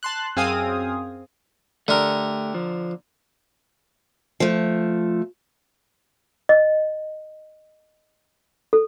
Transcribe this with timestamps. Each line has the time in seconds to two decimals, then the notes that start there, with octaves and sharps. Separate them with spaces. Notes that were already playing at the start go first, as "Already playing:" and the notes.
0.03 A5 C6 F#6
0.36 F#2 C4 G#4 F5 G#5 D#6
1.88 D3 A3 G4 A#4
2.54 F3
4.40 F3 A3
6.49 D#5
8.73 A4